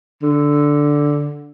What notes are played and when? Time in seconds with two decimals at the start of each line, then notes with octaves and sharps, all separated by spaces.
0.23 D3